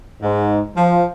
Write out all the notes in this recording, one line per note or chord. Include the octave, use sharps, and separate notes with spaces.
G#2
F3